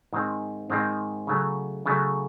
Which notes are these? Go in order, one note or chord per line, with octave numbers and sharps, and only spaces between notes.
G#2 D#3 G#3 C4
G#2 D#3 G#3 C4
C#3 F#3 A3
C#3 F#3 A3